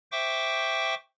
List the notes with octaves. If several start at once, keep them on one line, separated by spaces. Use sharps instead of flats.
C5 E5 G5 C#6 D6